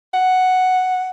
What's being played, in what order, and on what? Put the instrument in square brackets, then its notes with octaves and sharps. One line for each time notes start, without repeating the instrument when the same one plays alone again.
[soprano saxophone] F#5